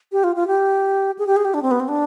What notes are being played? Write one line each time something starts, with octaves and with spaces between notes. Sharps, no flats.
G4
F4
F4
G4
G#4
G4
G#4
G4
D4
C4
B3
C4
D4